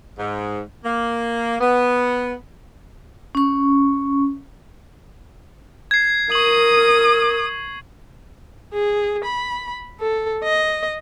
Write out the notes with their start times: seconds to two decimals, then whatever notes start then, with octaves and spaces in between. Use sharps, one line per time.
0.18 G#2
0.84 A#3
1.61 B3
3.35 C#4 C#6
5.91 G#6 C7
6.32 A#4 C#6 D#6 F#7
8.73 G#4
9.24 B5
10.00 A4
10.44 D#5